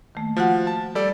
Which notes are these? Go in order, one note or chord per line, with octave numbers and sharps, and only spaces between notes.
D#3 A3 A#3
F3 F4 F#4 F#5
A5
G3 A4 D5